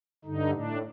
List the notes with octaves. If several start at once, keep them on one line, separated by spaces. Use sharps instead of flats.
G2 D3 D#4
A2 D4